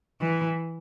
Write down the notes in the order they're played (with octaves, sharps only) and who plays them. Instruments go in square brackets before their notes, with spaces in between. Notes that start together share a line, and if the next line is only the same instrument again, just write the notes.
[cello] E3